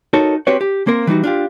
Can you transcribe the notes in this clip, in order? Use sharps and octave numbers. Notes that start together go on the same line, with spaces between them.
D#4 F#4 A4 A#4 C#5
C4 F#4 G4 B4 C#5
G4
A#3 C4 A#4
E3 G3 D#4 F#4
D4 F4 G4